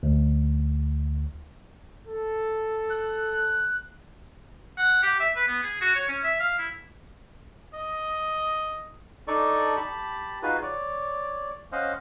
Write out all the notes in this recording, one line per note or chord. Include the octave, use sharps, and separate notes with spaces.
D2
A4
F#6
F#5
G4
E5
B4
B3
G#4
F#4
C#5
C#4
E5
F5
E4
D#5
D4 D#4 A4 D5 C#6
G4 A5 B5
D#4 F4 F#4 G#4 B4
C#5 D5
C#4 C5 D#5 F5 F#5